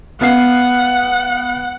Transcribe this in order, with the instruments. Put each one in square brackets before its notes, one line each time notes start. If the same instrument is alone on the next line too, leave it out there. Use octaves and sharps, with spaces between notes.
[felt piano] B3 F5 C7 [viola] F#5